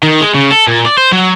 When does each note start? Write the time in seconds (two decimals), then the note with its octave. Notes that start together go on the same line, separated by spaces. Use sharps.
0.03 D#3
0.21 G#3
0.35 C#3
0.51 A4
0.68 A#2
0.86 D5
0.98 C5
1.12 F#3